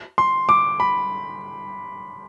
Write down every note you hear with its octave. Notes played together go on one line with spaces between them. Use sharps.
C6
D6
B5